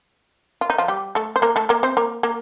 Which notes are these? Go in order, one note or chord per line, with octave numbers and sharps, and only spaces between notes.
F4
D#4
F3 F4
G3 G4
A3 A4
C5
A#3 A#4
A3 A4
A#3 A#4
C4 C5
A#3 A#4
A#3 A#4